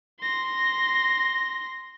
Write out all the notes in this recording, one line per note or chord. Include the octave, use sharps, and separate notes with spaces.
C6 A#6